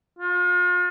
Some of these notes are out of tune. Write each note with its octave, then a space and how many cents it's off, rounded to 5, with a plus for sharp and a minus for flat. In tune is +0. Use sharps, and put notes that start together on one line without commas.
F4 +40